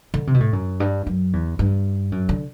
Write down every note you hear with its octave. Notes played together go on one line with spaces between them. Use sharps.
D3
C3
B2
A2
F#2
G2
F#2
E2
G2
F#2
D3